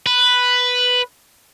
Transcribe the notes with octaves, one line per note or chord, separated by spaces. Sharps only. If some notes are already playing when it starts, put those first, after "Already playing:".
B4